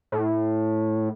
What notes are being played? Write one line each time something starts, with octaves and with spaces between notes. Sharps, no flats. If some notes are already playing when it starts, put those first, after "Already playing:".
A2